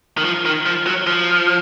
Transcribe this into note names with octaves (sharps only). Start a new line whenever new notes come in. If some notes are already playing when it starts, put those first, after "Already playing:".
D#3
F3
D#3
F3
F#3
F3